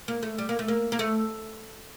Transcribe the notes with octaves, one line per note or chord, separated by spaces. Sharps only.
A#3
A3
G3
A#3
A3
A#3
A#3
A3